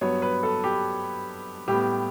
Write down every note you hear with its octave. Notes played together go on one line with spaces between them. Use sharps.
G2 F#3 B3 C#5
B4
A4
G4
A2 G3 B3 G4